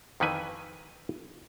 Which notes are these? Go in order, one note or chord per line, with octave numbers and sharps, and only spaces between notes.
F2 D#3 E3 B4 G#5